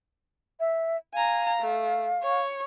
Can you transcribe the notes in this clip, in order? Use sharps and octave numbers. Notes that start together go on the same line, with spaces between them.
E5
F5 G#5 A#5
A3
C#5 C#6